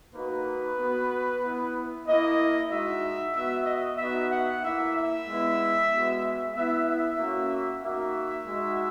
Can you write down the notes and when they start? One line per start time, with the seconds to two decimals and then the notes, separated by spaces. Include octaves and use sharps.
0.14 A#3 D#4 F#4 B4
0.78 B3 F#4
1.42 B3 E4
2.06 A#3 E4 D#5
2.70 G#3 D#4 F#4 E5
3.35 B3 F#4 E5
3.66 D#5
3.98 B3 D#4 F#4 E5
4.31 F#5
4.62 A#3 E4 E5
4.94 E5
5.27 G#3 B3 E4
5.91 G#3 B3 F#4
6.54 B3 E4 E5
6.87 E5
7.18 A#3 C#4 F#4
7.82 A#3 D#4 F#4 E5
8.46 G#3 D#4 F#4